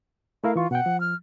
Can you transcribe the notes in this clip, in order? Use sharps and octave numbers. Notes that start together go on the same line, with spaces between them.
A3 E4 A#4 F5
E3 F4 C#6
B2 F#5 G5
F3
F6